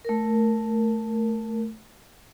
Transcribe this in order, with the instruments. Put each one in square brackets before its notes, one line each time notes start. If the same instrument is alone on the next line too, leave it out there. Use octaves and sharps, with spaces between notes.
[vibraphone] A3 A#4